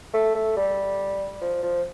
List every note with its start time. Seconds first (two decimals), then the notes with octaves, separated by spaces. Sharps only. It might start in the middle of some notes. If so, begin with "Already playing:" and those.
0.14 A3
0.35 A3
0.56 G3
1.41 F3
1.62 F3